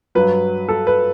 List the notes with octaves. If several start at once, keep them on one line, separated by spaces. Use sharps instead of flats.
G2 F#3 B4
A4
B4